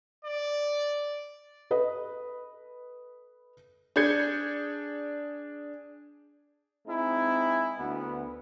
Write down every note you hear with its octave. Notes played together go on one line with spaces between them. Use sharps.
D5
A4 B4 D#5
D4 G#4 G6 G#6 C#7
G#3 C4 D#4 E4
D2 B3